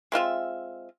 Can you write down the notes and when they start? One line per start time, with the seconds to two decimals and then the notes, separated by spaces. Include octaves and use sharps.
0.12 G#3 C4 F4 E5